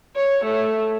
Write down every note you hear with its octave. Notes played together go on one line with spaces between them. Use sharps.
C#5
A3